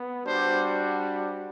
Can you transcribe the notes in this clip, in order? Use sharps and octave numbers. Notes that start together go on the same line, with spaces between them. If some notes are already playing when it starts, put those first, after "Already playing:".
Already playing: B3
G3 D4 F#4 C5